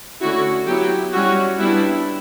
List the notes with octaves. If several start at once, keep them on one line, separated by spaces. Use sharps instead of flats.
D3 A3 C#4 E4 F#4
F#3 B3 E4 G4
G3 C#4 E4 F#4
G3 B3 D4 E4